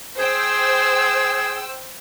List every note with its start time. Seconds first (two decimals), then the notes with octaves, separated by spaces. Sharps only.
0.19 G#4 C5 G5 E6